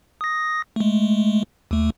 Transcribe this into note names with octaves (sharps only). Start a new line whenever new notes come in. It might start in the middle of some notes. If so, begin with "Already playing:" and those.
D#6 A#6
G#3 A3
D#2 A3